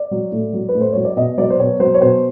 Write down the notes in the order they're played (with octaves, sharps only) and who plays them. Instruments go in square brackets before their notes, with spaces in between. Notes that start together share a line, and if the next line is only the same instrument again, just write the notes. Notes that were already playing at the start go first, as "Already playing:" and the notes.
Already playing: [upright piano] D5
F#3
A2
F#3
B4
A2
C5
F#3 C#5
D5
B2 D#5
F#3 D5
C5
B2 C#5
F#3 C5
C#5
B2 C5